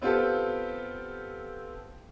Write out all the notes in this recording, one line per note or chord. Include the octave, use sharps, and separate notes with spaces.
B3 C4 F4 G4 A4